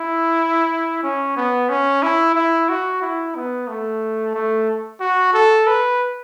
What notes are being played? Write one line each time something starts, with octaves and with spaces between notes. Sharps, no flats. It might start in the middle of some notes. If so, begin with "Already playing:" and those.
Already playing: E4
C#4
B3
C#4
E4
E4
F#4
E4
B3
A3
A3
F#4
A4
B4